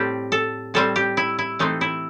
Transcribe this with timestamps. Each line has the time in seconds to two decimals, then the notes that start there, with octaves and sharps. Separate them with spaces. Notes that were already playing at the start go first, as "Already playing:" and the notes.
Already playing: A2 G3 C4 G4 A4
0.32 A4
0.74 A2 G3 C4 A4
0.96 G4
1.17 E4
1.39 E4
1.59 E3 A3 C4 D#4
1.81 E4